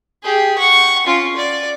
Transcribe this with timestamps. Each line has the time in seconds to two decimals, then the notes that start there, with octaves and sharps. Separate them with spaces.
0.23 G4 G#4
0.58 F#5 C#6
1.07 C#4 F4
1.37 D5